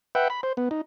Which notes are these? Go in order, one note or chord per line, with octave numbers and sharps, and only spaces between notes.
B4 E5 F#5 G5
B5
C5
B3
D#4